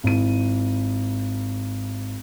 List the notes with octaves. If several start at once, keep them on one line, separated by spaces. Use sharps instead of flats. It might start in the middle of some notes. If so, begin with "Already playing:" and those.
G#1 E4 D#7